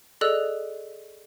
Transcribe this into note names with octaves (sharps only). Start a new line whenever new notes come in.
G#4 A4 D5 D#5 E6 F#6